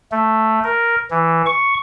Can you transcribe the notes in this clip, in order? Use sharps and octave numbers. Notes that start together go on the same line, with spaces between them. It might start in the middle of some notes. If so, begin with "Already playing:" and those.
A3
A#4
E3
C#6